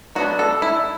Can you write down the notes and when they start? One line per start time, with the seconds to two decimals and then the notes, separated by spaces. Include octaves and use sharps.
0.15 F#3 B3 D4 F#4
0.39 A4
0.62 E4